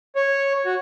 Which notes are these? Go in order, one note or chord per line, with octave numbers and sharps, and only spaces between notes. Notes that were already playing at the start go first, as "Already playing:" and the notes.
C#5
F#4